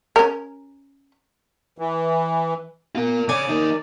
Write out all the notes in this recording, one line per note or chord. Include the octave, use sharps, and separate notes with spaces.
C#4 A#4
E3
B3 F4 A#4
C#3 C#5 D5 G#5
D#2 D#4 A#4